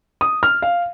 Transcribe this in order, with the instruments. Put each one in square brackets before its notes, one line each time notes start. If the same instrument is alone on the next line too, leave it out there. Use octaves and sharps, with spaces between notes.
[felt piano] D#6
F6
F5